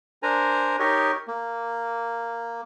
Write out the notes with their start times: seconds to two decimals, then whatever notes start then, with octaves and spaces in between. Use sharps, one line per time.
0.23 D4 A#4 C5 G#5 A#5
0.79 D#4 G4 A#4 C#5 D#5
1.28 A#3